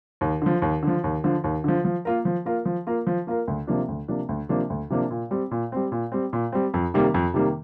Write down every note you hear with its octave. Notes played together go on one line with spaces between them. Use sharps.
D#2
D3 F3
D#2
D3 F3
D#2
D3 F3
D#2
D3 F3
F3
A#3 F4 A#4
F3
A#3 F4 A#4
F3
A#3 F4 A#4
F3
A#3 F4 A#4
D2
C3 F3 A#3 D4
D2
C3 F3 A#3 D4
D2
C3 F3 A#3 D4
D2
C3 F3 A#3 D4
A#2
G3 C4
A#2
G3 C4
A#2
G3 C4
A#2
G3 C4
F2
C3 D#3 G3 A#3
F2
C3 D#3 G3 A#3